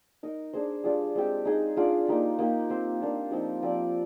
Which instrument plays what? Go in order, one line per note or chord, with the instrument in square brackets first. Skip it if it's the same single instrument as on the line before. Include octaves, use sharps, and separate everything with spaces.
[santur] D#4 A#4 D#5
D4 G#4 C5
G3 D4 F4 G#4
G#3 C4 G4
D#4 G#4 D#5
D4 F4 G#4 D5
A#3 D#4 G4
A#3 D#4 G4
C4 G4 C5
A#3 D4 F4
F3 C4 D#4 G4
F3 C4 G4 D5